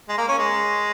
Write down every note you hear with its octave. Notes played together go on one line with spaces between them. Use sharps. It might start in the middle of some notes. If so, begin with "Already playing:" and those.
G#3
A#3
C#4
G#3